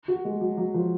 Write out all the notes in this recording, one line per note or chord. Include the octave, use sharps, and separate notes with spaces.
F#4
G#3
F#3
F#3
F3